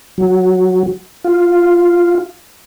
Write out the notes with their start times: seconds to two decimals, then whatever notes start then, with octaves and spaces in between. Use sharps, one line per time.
0.18 F#3
1.24 F4